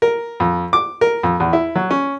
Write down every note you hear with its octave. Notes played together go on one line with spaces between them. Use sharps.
A#4
F2
D6
A#4
F2
E2
E4
F#3
C#4